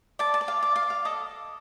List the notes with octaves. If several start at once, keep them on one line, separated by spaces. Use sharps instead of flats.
D5 A5
A5
D5
F5
D5
F5
D5
F5
A4 D#5